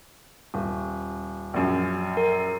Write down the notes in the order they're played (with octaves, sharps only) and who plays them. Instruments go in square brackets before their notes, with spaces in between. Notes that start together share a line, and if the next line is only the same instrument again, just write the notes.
[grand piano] D#1
A#1 F#2
[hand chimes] A#4